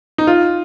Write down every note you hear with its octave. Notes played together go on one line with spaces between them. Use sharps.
D#4
F4